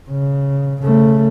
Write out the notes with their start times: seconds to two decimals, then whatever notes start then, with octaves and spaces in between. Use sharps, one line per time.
0.10 C#3
0.82 C#3 A3